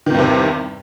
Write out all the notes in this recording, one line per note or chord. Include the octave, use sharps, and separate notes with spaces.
E2 G2 C3 D#3